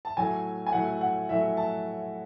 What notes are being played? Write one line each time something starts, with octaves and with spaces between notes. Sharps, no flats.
A5
A2 F#3 A3 G#5
G#5
A2 F#3 A3 F#5
F#5
A2 F#3 A3 E5
A5